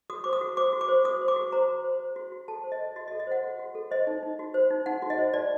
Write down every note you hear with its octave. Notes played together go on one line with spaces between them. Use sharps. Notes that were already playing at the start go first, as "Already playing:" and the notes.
F#4 D#6
C5 D6
D#6
F#4
C5 D6
F#4
D6
C5
F#4 D#6
C5
D6
F#4
C5 A#5
F#4
C5
C5
F#4
F#4
A4 A5
C5
D#5
F#4
F#4 D#5
D#5
A4
D#5
C5 F#5
F#4
F#4
A4
C5 D#5
D#4
D#4
F#4
C5
D#4
D#4 F#5
F#4
D#5
C5
D#4 D5